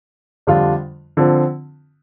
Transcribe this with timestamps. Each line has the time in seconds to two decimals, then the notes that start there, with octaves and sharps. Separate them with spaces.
0.47 F2 D3 G3 D4 F4
1.17 D3 F3 C4